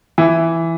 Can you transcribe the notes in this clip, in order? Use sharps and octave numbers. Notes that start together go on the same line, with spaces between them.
E3